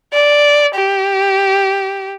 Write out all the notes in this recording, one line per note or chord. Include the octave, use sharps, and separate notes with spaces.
D5
G4